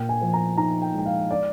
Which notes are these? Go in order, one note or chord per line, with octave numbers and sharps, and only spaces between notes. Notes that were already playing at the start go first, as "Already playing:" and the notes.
Already playing: A#2 G5
G#5
F3
A#5
D#4 A#5
G5
G#3 G5
F5
D5